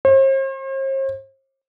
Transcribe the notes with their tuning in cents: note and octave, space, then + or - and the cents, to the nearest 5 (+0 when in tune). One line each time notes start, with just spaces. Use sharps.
C5 +45